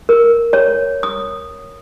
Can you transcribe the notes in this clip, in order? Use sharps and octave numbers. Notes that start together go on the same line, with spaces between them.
A#4
C#5
D#6